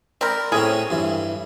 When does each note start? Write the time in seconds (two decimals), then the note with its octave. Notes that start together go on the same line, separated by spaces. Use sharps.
0.21 C4 A#4 D5 B5
0.52 A2 C4 C#4 G#4
0.90 G2 E3